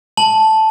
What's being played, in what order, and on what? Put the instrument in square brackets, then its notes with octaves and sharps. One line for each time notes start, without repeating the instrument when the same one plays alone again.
[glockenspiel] A5 F#7